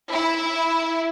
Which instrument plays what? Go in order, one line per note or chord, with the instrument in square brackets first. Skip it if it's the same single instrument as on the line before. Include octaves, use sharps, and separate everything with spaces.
[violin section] E4